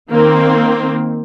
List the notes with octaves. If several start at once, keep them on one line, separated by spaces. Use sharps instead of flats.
D#3 A#3 C4